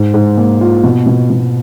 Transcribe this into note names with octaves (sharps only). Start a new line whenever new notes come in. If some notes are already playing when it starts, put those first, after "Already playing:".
Already playing: G#2
G#2
A#3
F4
B2
B2
B2